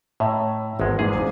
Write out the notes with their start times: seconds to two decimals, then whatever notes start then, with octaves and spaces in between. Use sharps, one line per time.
0.20 A2 C#5 E5 A#5
0.80 G#1 E2 G#3
0.99 E2 G#2 G#3 G#4
1.14 E2 C#3